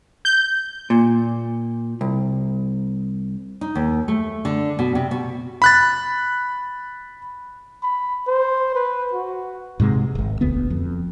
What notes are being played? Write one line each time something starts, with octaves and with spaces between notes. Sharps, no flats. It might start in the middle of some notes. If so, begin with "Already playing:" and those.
G6
A#2
C2
D#4
D#2
A3
D3
B2
C3
B2
B5 F#6 A6
B5
C5
B4
F#4
G#2 C3 G#3
D1 G#1
E1 D2 B3
F2